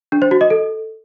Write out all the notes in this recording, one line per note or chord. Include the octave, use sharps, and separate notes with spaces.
D4
C5
F#4
D#5
A4